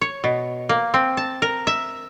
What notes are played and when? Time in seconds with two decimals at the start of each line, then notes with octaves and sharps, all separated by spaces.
0.01 C#5
0.24 B2
0.69 A#3
0.94 C4
1.17 A5
1.42 A#4
1.67 E5